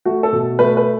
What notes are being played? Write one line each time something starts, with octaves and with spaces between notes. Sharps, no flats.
A3 F#4
A4
B2
A3 B4
B4